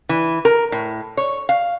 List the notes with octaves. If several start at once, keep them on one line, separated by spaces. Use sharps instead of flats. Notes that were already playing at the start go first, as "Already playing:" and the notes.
E3
A#4
A2
C#5
F5